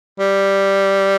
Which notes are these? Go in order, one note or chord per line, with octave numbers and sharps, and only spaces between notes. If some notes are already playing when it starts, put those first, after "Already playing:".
G3